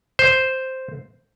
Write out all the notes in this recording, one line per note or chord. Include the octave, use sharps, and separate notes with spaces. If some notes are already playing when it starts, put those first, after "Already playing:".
C5